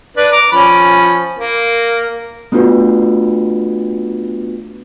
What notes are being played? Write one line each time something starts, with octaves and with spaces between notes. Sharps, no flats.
D4 B4 D5
A#5 D6
F3 C#4 B5
A#3
A3 B3 D4 F4 F#4 B4